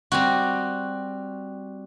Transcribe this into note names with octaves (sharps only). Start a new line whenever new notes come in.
G3 C4 F#4